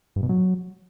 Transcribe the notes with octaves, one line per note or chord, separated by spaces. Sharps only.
G2
B2
F#3